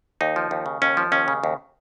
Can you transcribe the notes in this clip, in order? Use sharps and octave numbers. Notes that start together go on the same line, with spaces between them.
D#2 D#4
F3
D#2
C#3
D#2 C#4
F3
D#2 C#4
C#3
D#2